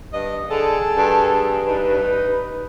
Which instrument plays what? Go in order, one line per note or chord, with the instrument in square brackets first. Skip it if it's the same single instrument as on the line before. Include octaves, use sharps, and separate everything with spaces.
[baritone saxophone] G2 [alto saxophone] D#5
[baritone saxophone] D3 [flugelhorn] G#4 [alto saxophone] A4
[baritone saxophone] G2
[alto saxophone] D#4 [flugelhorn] B4